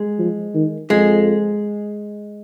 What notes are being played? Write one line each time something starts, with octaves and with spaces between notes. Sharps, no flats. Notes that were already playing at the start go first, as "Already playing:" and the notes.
Already playing: G#3
F3
D#3
F2 G#3